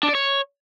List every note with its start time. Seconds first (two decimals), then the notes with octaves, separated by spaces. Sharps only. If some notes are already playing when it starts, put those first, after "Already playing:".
0.03 D4
0.09 D5
0.15 C#5